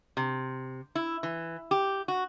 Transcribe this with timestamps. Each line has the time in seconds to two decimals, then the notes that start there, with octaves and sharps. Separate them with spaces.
0.17 C3
0.95 E4
1.23 E3
1.71 G4
2.08 F#4